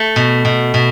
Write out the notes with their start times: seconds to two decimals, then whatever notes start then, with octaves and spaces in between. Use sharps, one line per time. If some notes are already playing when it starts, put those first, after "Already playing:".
Already playing: A3
0.16 B2
0.45 B2
0.74 B2